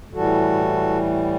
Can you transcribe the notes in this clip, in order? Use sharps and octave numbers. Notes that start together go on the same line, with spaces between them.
A2 E3 G3 F#4 A4